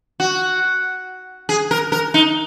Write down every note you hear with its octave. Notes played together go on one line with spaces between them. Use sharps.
F#4
G#4
A#4
A#4
D#4